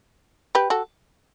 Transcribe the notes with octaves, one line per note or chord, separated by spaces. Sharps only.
G4 B4
F#4 A4